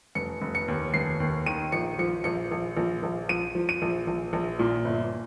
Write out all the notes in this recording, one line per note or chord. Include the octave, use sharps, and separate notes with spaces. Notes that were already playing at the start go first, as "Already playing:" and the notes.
F1 C#7
F1
C#7
D#2
F1 C7
D#2
D#3 D#7
A#1 C#7
F3 C#7
A#1 C#7
A#1
A#1
A#1
F3 D#7
F3
D#7
A#1
A#1
A#1
A#2
G1